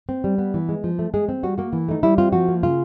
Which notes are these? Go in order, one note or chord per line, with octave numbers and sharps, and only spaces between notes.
C4
G3
B3
E3
G#3
F3
A3
G#3 G#4
C4
G3 F#4
A#3 F#4
E3
A3 D#4
G3 E4
C4 F4
F3 F#4
A#3
C#3 F4